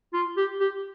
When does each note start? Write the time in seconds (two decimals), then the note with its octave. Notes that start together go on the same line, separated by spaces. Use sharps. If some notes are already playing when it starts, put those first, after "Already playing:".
0.13 F4
0.37 G4
0.60 G4